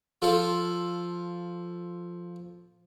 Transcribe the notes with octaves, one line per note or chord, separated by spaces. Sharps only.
F3 F4 A4